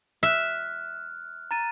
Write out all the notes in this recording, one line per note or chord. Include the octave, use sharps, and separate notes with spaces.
E5 F6 F#6
A#5 A6 D#7